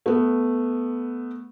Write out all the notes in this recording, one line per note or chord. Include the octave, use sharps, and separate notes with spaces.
A3 B3